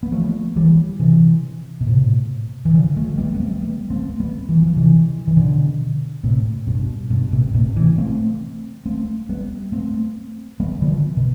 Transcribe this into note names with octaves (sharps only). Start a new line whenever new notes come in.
B3
F3 A3
E3 G3
C3 E3
B2
A2 C3
E3
D3 F3
F3 A3
G3 B3
B3
A3 C4
G3 B3
A3 C4
G3 B3
E3
F3
C3 E3
E3
B2 D3
A2 C3
G2 B2
G2 B2
A2 C3
A2 C3
C3 E3
A3 C4
A3 C4
G3 B3
A3 C4
G3 B3
D3 F3
B2